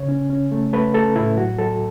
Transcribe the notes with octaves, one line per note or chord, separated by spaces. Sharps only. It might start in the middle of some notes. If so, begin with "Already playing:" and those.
Already playing: C#3 C#5
C#4
C#4
A3
A3 B4
A3 A4
A2 E4
F#3 F#4
F#3 A4